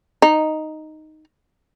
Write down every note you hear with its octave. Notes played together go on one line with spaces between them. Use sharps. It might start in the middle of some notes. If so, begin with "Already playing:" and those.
D#4